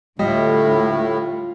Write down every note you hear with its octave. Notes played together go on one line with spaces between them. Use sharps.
D2 A2 G3 F4 D#5